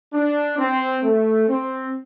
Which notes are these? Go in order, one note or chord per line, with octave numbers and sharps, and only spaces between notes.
D4
C4
A3
C4